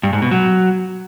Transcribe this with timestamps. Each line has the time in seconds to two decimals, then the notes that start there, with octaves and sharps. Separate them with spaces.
0.03 G2
0.13 G#2
0.22 B2
0.31 F#3